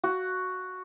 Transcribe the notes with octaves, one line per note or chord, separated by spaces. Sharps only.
F#4